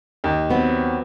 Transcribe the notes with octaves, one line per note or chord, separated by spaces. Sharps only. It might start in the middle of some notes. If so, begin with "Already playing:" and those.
D#2
F#3 B3 C4